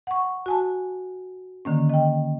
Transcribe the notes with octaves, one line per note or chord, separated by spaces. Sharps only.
F#5 C#6
F#4 G#5 A5
D3 D#3 A#3 C#4
D#5 G5